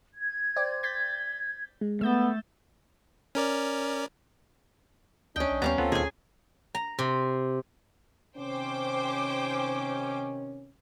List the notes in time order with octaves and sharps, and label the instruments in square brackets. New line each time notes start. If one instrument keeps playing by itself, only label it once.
[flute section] G#6
[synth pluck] C5 D5 G5
G6 A6 B6
G#3
[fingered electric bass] A3 [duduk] B3 [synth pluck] E6 G6 A6
[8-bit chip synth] C#4 A#4 D5
[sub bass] D2 [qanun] C#4 G5 [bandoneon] D4 D#5
[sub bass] B1
[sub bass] D#2 [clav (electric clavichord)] G3 B3 [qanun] C#4 F5 A#5
[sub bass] D2 [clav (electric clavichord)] B3 [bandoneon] C4 F4 A4
[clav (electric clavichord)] D#2 A#2 [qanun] G#4 G#5
[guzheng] A#5
C3
[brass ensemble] C3 D#3 C#4 [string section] C5 G5 D6